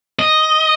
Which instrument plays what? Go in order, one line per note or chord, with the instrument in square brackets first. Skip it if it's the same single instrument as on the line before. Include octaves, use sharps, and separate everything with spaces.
[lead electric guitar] D#5